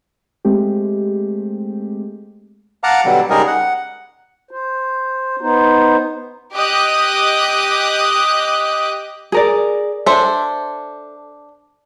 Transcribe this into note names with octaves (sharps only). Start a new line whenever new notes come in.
G#3 A3 C4 G4
F5 F#5 A5 A#5 D6
B2 D3 F#3 G3
C#3 G3 G#3 D#4 G#4 A#4
F#5
C5
B3 D#4 C5
G4 D#5 D6 D#6 F#6
G#4 A#4 D5
D4 A4 C5 E5